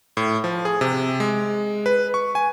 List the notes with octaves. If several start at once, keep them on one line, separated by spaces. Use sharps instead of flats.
A2
F3
G#4
C3
G#3
B4
C#6
G#5